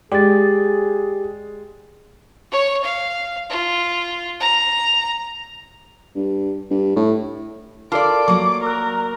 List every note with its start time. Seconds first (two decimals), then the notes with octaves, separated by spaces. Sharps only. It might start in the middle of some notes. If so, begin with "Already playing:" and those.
0.12 G#3 G4 G#4 D5 A6
2.51 C#5
2.83 F5
3.50 F4
4.40 A#5
6.15 G2
6.70 G2
6.96 A2
7.92 F4 A4 A#4 D5 A5 D6
8.28 F#3 A#3 C#6
8.63 A#4 C#6 E6 F#6